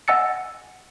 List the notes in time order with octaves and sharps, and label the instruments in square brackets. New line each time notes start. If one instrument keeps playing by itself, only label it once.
[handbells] D#5 F#5 G#5 E6 A6 C#7